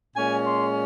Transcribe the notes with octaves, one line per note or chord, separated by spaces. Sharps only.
A#2 G#3 C#4 G#5
C6